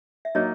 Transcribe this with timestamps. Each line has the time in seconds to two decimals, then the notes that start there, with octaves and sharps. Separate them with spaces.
0.25 E5
0.35 F#3 A#3 D#4 C#5 D#5